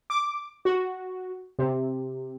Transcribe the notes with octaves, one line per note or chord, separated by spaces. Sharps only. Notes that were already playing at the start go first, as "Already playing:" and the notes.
D6
F#4
C3